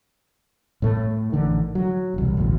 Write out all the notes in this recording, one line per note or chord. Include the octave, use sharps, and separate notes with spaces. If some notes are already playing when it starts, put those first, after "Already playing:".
A2 A3
A1 D3 D#3
F#3
E1 C2
A1 D2 B2